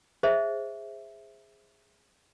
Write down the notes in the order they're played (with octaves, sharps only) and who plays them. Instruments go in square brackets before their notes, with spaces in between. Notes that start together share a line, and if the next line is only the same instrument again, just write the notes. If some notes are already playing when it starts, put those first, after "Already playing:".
[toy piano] G#4 C5 D#5 E5